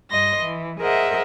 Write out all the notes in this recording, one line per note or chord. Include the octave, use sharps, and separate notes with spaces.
G2 D#5 C6 A#6
E3
G#4 A#4 C5 D#5 E5 F#5